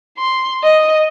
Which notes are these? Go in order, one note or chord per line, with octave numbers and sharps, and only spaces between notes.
C6
D#5